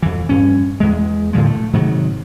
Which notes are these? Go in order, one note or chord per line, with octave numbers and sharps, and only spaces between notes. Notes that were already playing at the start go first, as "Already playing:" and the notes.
F2 E3
G2 C#4
E2 G#3
A2 D3 F3 G#3
A3
G#2 C3 D#3 F#3